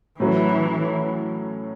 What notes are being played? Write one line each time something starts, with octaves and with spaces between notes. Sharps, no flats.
A2 E3 F#3 C#4